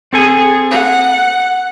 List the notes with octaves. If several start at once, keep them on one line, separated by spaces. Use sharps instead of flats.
C4 G#4 A4 G#5
F#5